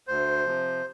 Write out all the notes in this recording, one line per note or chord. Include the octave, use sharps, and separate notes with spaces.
D2 C5
C3 F3